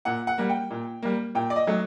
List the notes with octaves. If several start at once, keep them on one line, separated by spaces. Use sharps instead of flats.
A#2 F#5
F#5
G3 A#3
G5
A#2
G3 A#3
A#2 G5
D5
D#5
F#3 A3 D#4